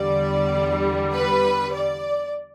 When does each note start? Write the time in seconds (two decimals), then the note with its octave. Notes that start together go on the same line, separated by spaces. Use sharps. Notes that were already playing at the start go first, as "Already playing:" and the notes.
Already playing: E2 D3 G3 D5
1.13 B4
1.73 D5